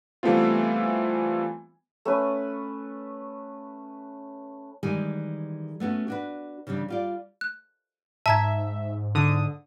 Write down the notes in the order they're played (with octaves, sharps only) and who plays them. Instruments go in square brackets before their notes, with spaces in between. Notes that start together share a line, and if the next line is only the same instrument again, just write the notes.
[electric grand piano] E3 G3 A3 B3 C4 F4
[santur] A3 C#4 B4
[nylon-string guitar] D#3 E3 G3 G#3 G#5
A3 B3 C#4 F#4
D4 F#4 B4
C#3 E3 G3 D4
G3 F4 D5
[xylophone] F#6
[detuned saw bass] G#2 [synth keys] E5 [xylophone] A5 A#5 G#6
[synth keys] D3 D#6